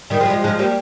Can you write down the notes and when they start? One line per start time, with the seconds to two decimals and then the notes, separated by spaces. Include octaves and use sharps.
0.10 D#3 G3
0.20 F3 G#3
0.26 G3
0.30 F3 G#3
0.44 F3 G#3
0.59 G3 A#3